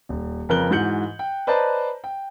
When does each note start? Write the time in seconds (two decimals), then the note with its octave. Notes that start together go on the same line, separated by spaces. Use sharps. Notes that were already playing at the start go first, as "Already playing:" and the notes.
0.09 D#1
0.49 F2 C#3 A#4 B4 F#6 G7
0.71 G#2 E3 F#4 G6 C#7 F#7
1.19 G5
1.47 B4 C5 D5 D#5 A5 A#5
2.04 G5